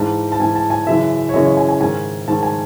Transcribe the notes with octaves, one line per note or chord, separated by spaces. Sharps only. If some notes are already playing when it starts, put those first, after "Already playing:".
Already playing: G#2 E3 A5
A5
G#2 E3 G#5
A5
G#5
F#2 C#3 E3 E5
C#5
F#2 C#3 E3 D#5
C#5
G#5
G#5
G#2 D#3 G#5
G#2 D#3 A5
G#5